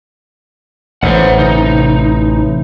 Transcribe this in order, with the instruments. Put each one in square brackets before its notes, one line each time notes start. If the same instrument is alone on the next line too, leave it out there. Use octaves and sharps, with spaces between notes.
[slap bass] A1 [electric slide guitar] C5 F#5
[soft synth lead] C3 [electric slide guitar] D#4